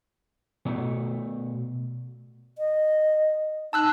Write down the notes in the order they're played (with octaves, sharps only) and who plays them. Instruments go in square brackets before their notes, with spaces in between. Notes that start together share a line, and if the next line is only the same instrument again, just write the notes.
[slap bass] B2 A3
[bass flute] D#5
[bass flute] D#4 [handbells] A5 E6 F#6